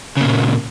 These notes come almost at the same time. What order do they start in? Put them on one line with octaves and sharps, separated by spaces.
C#3 A#3 A#2